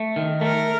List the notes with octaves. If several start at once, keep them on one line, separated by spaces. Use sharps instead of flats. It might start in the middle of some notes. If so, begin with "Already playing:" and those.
Already playing: A3
D#3
A3 A#4